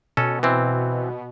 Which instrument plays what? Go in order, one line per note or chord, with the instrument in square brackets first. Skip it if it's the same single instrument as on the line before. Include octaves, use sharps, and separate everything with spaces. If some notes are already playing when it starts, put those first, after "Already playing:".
[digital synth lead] B2 [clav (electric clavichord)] C#4 A4
[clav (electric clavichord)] E3 C4